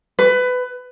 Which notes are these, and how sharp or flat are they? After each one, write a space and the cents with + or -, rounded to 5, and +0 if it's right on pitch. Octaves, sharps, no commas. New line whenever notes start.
B4 +20